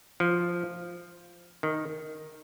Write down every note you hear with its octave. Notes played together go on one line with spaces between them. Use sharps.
F3
D#3